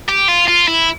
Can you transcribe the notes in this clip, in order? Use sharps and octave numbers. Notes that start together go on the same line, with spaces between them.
G4
F4
F4
E4